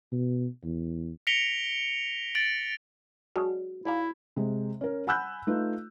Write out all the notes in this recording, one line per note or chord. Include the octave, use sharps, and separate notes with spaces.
B2
E2
A#6 B6 C#7 D7 F7 G7
A6 D7 F#7
F#3 G#3 D4 F#4
G#2 E4 D5 F5
C3 G#3
C#4 A#4
F#5 G#5 B5 E6 F#6 G6
A3 D#4 F4 B4